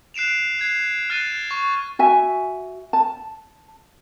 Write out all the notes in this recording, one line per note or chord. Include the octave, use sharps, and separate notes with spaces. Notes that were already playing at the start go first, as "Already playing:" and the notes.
F#6 C7 D7 E7 F7
F#6 G#6 C7
F6 F#6 A6 C7 D#7
C#6
F#4 E5 G#5
A5